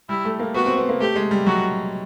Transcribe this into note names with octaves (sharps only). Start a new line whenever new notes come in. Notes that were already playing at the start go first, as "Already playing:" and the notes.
G3 E4
A3
A#3
B3 F#4
C4
B3
A#3
A3 G4
G#3
G3
F#3 F#4